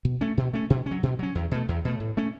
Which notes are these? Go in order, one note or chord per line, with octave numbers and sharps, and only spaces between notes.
B2
A3 C#4
B2
A3 C#4
B2
C#4
F#3
B2
F#3 C#4
E2
B2 A3
E2
B2 A3
A2
A3 C#4